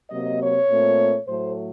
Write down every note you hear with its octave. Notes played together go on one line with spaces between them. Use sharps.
C3 F#3 A#3 D#5
C#5
A#2 A3 C4
A2 F#3 A3 C5